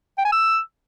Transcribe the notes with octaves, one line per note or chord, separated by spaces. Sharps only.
G5
G#5
E6